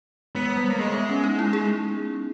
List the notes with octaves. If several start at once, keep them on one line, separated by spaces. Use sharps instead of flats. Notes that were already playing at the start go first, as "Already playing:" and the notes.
G#3 B3
G#3
G3
G#3 A#3
G#3 A#3
B3
C#4
D#4
E4
G#4